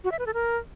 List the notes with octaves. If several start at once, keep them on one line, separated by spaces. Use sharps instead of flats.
F#4
E5
B4
A4
A#4